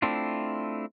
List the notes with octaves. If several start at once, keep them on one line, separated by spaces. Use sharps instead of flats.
A3 C4 D4 E4 F4